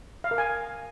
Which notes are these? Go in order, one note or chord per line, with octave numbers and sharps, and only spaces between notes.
F5
A#4
G#5